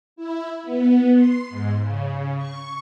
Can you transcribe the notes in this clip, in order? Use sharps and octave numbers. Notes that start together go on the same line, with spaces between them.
E4
B3
C6
G#2
C#3
C#6